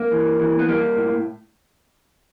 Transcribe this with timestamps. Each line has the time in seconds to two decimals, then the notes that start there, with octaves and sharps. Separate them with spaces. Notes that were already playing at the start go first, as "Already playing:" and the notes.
Already playing: A#3
0.11 E3
0.40 E3
0.59 B3
0.68 G3 A#3
0.97 A2